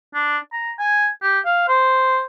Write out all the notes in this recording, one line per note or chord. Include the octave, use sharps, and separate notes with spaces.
D4
A#5
G#5
G4
F5
C5